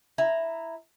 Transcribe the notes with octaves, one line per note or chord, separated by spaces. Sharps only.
E4 A#5